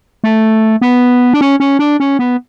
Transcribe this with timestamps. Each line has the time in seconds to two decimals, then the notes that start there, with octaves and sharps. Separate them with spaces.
0.24 A3
0.81 B3
1.34 D4
1.41 C#4
1.60 C#4
1.79 D4
2.00 C#4
2.19 B3